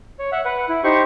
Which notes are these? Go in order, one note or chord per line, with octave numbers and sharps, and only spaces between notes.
C#5
E5 F#5
B4 F#5
E4
D#4 G4 C5 C#6